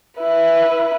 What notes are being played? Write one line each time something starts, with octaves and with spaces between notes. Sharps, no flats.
E4 B4